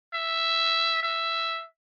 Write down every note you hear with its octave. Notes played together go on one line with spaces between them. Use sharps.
E5
E5